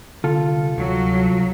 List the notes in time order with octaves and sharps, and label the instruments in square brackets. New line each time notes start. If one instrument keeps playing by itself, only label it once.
[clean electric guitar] C2 F4 A4 [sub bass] D3
[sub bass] D2 [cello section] F#3